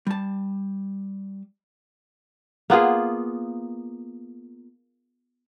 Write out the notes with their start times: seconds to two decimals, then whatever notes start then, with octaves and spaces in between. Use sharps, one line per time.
0.07 G3 A5
2.70 A#3 B3 F4 G#4